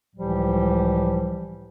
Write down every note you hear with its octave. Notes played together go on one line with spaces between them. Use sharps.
C#2 A2 E3 F3 G3 G4